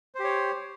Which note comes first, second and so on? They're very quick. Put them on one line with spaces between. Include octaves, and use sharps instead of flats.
C5 G4 C#5